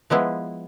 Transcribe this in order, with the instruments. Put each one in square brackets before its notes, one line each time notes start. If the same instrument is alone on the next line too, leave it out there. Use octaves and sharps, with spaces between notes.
[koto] F3 G#3 B3 E4